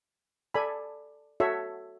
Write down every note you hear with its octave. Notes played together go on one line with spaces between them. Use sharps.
A4 D5 G#5 B5
F#4 A4 C#5 E5